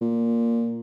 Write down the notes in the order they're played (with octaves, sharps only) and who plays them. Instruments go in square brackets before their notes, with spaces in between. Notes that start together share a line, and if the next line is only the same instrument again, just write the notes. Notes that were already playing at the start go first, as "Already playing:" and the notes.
[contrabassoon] A#2